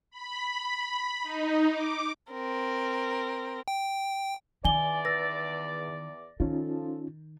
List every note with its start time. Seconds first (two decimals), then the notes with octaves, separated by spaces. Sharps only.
0.11 B5
1.23 D#4
1.70 D6
2.33 C4 A#4
3.68 G5
4.65 E2 D#3 D5 G#5 G7
5.05 B4 E6 A6 A#6
6.40 D#3 F3 C#4 D#4 F4 A4